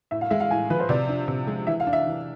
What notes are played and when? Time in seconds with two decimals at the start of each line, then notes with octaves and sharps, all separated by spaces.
0.11 A2 E5
0.21 F5
0.30 G#3 E5
0.40 F5
0.51 A2 G#5
0.70 F3 B4
0.80 C5
0.89 C3 D5
1.09 D4
1.28 C3
1.47 G#3
1.67 E3 E5
1.80 F5
1.87 D4
1.93 E5
2.07 E3